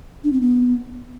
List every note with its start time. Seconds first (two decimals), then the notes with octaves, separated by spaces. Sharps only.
0.24 D4
0.33 C4
0.41 B3